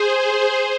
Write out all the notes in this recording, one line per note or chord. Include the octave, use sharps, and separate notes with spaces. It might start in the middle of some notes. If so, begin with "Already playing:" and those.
Already playing: G#4 C5